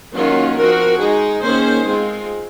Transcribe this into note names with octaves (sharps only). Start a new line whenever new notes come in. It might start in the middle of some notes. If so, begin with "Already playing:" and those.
D#3 F#3 A#3 C#4 F4
F3 C4 F#4 A#4
G#3 D#4 G#4
D#3 A#3 C#4 G#4 C5
G#3 C4 F4